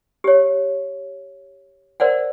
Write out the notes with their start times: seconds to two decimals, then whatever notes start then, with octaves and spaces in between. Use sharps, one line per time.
0.24 G4 C#5
2.00 A#4 C5 D5 F#5